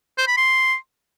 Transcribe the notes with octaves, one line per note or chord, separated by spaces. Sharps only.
C5
B5
C6